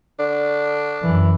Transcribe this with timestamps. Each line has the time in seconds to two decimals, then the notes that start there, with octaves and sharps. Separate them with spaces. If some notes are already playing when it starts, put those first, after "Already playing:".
0.19 D3 D4
1.03 F#2 E3